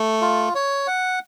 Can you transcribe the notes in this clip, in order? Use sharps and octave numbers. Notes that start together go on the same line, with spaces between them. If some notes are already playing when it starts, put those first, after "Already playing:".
Already playing: A3
F4
C#5
F#5